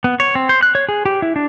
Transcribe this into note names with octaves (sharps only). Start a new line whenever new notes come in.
B3
C#5
C4
C5
F#6
C#5
G#4
G4
E4
D4